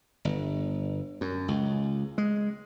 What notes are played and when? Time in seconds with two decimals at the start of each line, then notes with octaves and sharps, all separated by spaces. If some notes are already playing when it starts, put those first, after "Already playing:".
0.25 G1
1.21 F#2
1.48 C#2
2.18 G#3